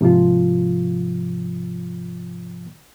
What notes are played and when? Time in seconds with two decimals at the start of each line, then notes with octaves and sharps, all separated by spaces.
0.01 G#2 C3 F3 F4